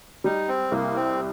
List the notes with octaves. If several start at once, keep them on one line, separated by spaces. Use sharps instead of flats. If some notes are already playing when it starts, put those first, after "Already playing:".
G3 D#4
C4
C2 A#3
C4